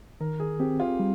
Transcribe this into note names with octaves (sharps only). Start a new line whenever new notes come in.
D#3 A#4
G#4
C4 G4
F4
G3